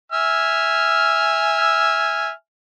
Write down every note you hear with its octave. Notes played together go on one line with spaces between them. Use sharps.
E5 G#5 F6